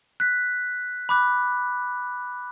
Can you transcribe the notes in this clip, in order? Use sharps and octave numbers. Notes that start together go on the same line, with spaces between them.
F#6 B6
B5 D6 F#6